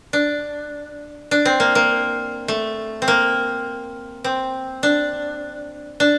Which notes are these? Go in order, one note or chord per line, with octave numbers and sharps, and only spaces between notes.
D4
D4
C4
A#3
A#3
A3
C4
A#3
C4
D4
D4